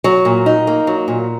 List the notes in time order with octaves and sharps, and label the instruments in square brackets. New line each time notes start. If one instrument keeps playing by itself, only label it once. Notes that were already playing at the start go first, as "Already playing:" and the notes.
[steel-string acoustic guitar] F#3
A#2
D#4
A#3
F#3
A#2